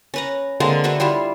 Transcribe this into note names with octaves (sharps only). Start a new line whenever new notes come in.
C#4 B4 A#5
D3 G#3 A#3 C4
D4 F#4 B4 E5
G3 E4 F4 E5